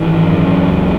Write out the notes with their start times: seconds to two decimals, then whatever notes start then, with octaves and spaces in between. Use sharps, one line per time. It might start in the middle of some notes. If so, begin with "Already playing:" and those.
Already playing: G#1 E3
0.23 F#2
0.68 C#2